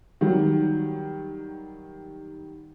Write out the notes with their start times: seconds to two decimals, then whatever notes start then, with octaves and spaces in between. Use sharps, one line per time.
0.21 D#3 F#3 G3